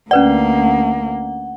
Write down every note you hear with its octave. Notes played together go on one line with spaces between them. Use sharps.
D2 A#3 C#4 B4 D5 F#5